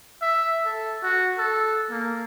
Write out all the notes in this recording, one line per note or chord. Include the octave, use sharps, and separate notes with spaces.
E5
A4
F#4
A4
A#3